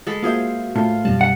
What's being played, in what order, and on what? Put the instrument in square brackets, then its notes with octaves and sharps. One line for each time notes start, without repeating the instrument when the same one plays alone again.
[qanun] G#3 A4 B5
[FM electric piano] A#3 F#4 E5 [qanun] F4 G#4 C5
[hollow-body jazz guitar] A2 [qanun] F4
[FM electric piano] F#2 B2 G3 [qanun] A5
[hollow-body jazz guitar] F#5